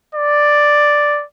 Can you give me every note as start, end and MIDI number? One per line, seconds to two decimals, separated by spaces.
0.15 1.24 74